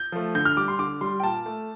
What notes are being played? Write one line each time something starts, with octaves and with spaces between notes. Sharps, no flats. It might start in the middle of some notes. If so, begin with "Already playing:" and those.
Already playing: G6
F3 A3
D3 G6
F6
G3 D6
C6
D3 D6
G3 C6
G5
A#2 A5
A3